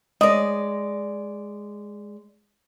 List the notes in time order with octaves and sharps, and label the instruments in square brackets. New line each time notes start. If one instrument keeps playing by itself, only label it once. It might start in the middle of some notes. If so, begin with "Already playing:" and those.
[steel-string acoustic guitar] G#3 D5 [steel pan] D#5